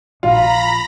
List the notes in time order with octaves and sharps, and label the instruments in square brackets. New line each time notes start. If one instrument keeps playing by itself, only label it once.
[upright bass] A#1 [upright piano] F4 [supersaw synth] A#5 B5 A#6